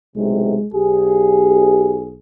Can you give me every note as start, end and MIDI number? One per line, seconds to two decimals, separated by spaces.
0.17 0.58 35
0.17 0.58 45
0.17 0.58 48
0.17 0.67 56
0.74 2.19 35
0.74 1.98 67
0.74 2.19 68